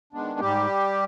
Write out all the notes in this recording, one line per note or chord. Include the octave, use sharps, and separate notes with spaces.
D#3 G#3 B3 D4
G#2 G3 G4